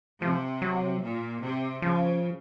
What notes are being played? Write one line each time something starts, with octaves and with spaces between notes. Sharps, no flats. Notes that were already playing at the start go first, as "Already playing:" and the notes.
C3 F3
F#3
A#2
C3
C#3 F3